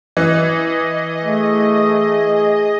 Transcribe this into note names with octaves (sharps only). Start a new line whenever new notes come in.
E3 D#5
A3 G#4